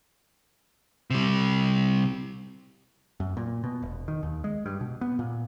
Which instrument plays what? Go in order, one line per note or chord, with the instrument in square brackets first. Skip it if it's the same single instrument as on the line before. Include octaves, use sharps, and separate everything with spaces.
[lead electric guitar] C3 G3
[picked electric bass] F#2
A#2
B2
E1
D#3
D#2
G#3
G2
B2
B3
A#2